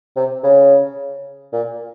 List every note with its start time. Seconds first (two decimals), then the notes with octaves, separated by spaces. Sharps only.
0.16 C3
0.44 C#3
1.53 A#2